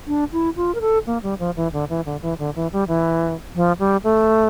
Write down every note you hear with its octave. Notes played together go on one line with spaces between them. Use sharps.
D4
E4
F4
A#4
A4
A#3
G3
F3
E3
D3
E3
D3
E3
D3
E3
G3
E3
F3
G3
A3